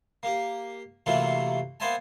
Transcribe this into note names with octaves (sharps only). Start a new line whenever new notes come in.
A#3 G4
C3 E3 F#3 A3 A#3 F4
A#3 B3 C5 E5 G#5 A5